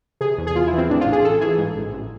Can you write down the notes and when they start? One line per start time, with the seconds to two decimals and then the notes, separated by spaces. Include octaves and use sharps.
0.21 C3 G#4
0.38 E2
0.47 G#4
0.55 E2 F4
0.67 E4
0.73 E3 C4
0.89 A2 D4
1.01 F4
1.06 A1
1.12 G#4
1.24 A1 A4
1.40 E3 G#4
1.58 G#2
1.76 A1
1.93 A1